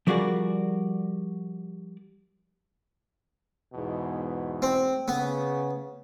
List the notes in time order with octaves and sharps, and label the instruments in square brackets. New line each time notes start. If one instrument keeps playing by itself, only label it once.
[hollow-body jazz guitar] F3 G3 F#4 G#4 A#4 D5
[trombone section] E2 G#2 B2
[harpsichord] C4
[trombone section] C#3 [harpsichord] B3